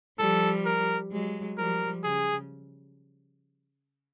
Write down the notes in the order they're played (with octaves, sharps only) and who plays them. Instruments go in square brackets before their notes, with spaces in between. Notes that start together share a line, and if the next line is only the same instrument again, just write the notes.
[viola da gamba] F3 G3 [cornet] A4
[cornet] A#4
[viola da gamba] F#3 G#3
[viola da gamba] F3 G3 [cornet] A#4
[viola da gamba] C#3 [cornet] G#4